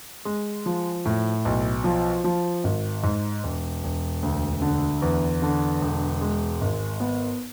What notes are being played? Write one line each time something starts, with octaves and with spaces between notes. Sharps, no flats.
G#3
F3
A2
B1
F3
F3
G#1
G#2
E1
E1
D2
D3
E2
D3
E1
G#3
G#1
B3